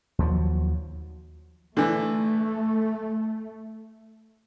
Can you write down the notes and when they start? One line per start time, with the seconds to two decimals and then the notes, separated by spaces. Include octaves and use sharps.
0.19 D#2 F3 F#3
1.77 D3 E3 A3